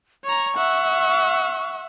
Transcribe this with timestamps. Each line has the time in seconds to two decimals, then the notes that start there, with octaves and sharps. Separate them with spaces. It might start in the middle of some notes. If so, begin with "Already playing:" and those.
0.25 C#5 A#5 C#6
0.57 E5 F#5